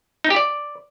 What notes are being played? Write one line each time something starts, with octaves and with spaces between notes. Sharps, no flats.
D#4
G4
D5